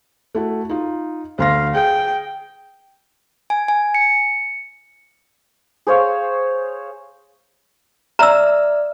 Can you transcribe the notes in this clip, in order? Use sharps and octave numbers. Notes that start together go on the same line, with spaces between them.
A3 E4 F#4
D#4 F4
D2 F5 C6 A#6
G#4 G5
G#5
G#5
C#7
G#4 C5 C#5 F5
D5 E5 A#5 E6 F6